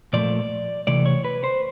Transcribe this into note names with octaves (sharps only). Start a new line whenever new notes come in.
A#2 F3 A3 D5
D2 C3 E3 A3 D5
C#5
B4
C5